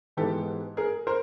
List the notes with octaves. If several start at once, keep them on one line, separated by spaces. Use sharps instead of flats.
G#2 E3 G#3 B3 G4 A4
G#4 A#4
A#4 C5